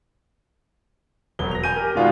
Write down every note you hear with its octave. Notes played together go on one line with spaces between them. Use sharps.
E1 F#3 B3 G7
A#6 F7
G#5 G6 D#7
G4 A#4
B2 D#3 G3 G#3 F4 F#4